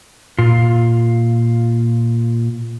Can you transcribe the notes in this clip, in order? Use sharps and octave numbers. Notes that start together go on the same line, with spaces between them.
A#2 F4